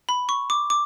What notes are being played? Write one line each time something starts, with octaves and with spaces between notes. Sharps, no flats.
B5
C#6
D6
D6